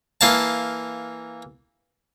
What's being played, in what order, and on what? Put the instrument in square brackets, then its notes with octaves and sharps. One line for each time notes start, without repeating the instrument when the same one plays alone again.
[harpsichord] E3 A#3 F5 A5